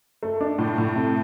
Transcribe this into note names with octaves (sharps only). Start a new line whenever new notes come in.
A3
D4
A2
A2
C3